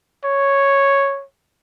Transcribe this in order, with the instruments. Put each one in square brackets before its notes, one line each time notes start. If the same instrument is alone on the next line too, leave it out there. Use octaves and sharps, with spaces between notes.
[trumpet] C#5